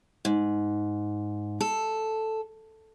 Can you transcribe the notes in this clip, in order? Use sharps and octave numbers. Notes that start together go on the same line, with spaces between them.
G#2
A4